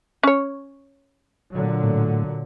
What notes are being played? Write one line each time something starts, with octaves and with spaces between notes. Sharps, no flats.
C#4 C#5
A#2 D3 F#3
A2